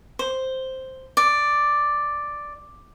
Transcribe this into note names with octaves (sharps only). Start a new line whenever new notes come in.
C5
D5